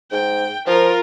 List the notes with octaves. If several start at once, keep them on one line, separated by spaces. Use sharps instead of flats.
G#2 G5
F3 F4 A#4